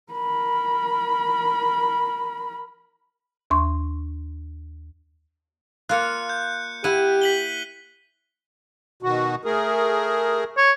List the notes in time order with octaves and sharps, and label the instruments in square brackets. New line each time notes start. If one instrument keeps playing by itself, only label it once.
[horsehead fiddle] A#4 B5
[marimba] D#2 C6 C#6
[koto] A#3 F4 [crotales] F#6 C#7
[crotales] G6
[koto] E4 F#5 [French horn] G4 [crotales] D#7
[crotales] B6 F#7 G7
[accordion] B2 D#3 F#4
A3 G#4 A#4
[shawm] C#5